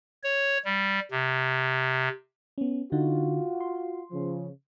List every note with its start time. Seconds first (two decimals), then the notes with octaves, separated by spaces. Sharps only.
0.24 C#5
0.64 G3
1.11 C3
2.58 B3 C#4
2.92 D3 D#4 F4 F#4
3.60 C6
4.12 C#3 F3